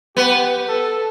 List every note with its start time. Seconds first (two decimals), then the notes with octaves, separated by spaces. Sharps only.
0.16 B3 G4
0.68 A4